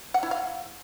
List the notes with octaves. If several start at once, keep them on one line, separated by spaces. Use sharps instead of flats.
F#5
E4
F5